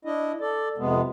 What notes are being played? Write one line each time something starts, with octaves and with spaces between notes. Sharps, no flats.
D4 E4 D#5
A4 D5
F2 C3 G#3 B3